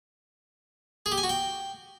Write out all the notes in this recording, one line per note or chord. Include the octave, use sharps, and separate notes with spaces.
G#4
G4
G#5
F#4
G5